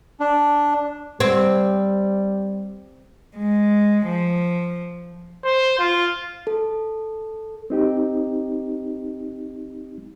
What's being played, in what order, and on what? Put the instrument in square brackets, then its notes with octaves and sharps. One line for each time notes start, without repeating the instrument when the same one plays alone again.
[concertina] D4
[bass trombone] G3 [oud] C4
[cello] G#3
F3
[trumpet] C5
F4
[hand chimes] A4
[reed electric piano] C4 D#4 G4